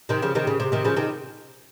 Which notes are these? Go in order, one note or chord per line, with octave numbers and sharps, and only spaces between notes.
C3 D#3
C#3 F3
C3 D#3
C#3
C3
C3 D#3
C#3 F3
C3 D#3